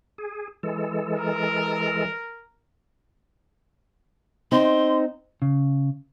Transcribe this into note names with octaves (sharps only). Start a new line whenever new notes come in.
G#4
E3 G#3 A4
A#4
C4 D#4 C6
C#3